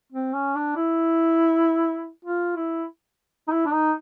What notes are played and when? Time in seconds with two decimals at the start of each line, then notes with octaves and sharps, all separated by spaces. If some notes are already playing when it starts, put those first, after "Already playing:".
0.12 C4
0.34 C#4
0.55 D4
0.76 E4
2.25 F4
2.56 E4
3.48 D#4
3.52 E4
3.66 D4
3.73 D#4